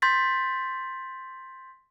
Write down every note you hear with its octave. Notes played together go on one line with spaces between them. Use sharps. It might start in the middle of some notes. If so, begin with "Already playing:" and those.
C6 G6 A6 B6